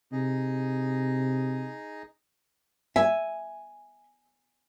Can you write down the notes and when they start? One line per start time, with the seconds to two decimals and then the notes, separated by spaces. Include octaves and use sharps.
0.12 C3 D#4 G#4 D#5
2.96 E5 G#5